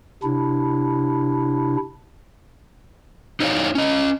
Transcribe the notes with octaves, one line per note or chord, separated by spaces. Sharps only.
C3 D4 E4
D#4 E4 C#5 D5 F5
C#4 D#5